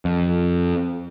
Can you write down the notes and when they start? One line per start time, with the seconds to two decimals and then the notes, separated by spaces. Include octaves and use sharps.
0.05 F2